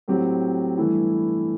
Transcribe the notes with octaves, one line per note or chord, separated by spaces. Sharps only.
A2 F#3 C4 G4
G2 E3 A3 E4